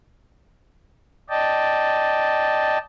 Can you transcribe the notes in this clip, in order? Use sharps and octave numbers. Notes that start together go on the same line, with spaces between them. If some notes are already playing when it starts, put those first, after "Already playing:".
D5 D#5 G5 A5